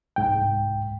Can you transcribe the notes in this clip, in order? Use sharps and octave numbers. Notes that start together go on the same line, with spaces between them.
C2 G#2 G5